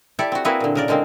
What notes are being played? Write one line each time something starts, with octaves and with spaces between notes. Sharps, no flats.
E4 G4 A4 D5
C4 F#4
A#3 C4 E4 F#4 G#4 B4
A#2 D3
C#3 A#4 D5
D3 G#3 A#3 C4